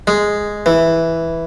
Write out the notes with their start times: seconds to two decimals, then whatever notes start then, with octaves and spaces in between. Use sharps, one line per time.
0.07 G#3
0.66 E3